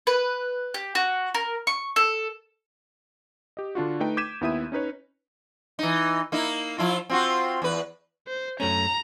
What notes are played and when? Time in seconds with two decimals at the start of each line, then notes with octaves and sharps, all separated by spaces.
0.07 B4
0.74 G4
0.95 F#4
1.35 A#4
1.67 C#6
1.96 A4
3.57 G4 D#5
3.75 D3 D4 F4 F#4
4.00 A3 D#4 B4 G5
4.17 D6 G6 G#6 B6 D#7 E7
4.41 D#2 B3 E4 E5 D#6 D#7
4.72 C#4 D#4 B4 C#5
5.79 E3 D#4
6.32 A#3 D#4 E4
6.78 F3 E4 F4
7.09 C4 F4 F#4
7.62 E2 B4
8.27 C5
8.60 F#2 A3 C#4 A#5